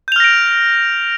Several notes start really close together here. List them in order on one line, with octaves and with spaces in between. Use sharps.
G6 F7 F6 A#6 D7